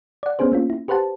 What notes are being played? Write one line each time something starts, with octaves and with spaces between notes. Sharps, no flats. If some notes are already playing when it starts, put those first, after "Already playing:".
D5 F#5
B3 C#4 D4 G#4 C5
A#3 C#4 F4
E4
G4 B4 C5 F#5 A5